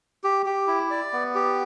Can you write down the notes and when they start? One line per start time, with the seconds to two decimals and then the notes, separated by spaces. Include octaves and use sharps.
0.24 G4
0.46 G4
0.67 E4
0.90 D5
1.13 B3
1.35 G4